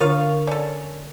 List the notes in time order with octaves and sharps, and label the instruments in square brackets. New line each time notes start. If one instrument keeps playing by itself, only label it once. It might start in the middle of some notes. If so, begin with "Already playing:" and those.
[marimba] D3 D4 [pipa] F4 C#5 F5 [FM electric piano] A#4
[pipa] C#4 A4 [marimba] D5